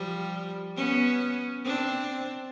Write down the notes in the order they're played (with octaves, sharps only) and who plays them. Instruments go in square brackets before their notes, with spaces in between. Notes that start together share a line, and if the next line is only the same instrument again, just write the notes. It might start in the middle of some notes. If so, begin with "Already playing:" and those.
Already playing: [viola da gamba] F3 G3
B3 C#4
C4 D4